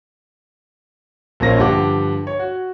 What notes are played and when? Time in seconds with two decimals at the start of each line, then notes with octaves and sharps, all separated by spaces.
1.40 A#1 F3 A#3 C#4 A#6
1.58 G2 D3 F3 G4 F#5 D6
2.27 C#5
2.39 F#4